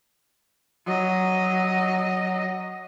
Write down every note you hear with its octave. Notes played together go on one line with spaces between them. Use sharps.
F#3 D#5